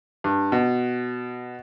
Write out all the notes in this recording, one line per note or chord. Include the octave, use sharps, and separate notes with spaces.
G2
B2